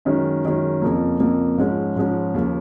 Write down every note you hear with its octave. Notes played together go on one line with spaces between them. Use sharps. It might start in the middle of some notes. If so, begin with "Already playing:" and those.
F#2 D#3 G#3 C#4
F#2 D#3 G#3 C#4
F2 C#3 F3 A#3
F2 C#3 F3 A#3
G#2 F3 G#3 C#4
G#2 F3 G#3 C#4
D#2 C#3 F3